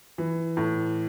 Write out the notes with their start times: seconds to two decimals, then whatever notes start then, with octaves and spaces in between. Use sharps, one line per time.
0.18 E3
0.57 A2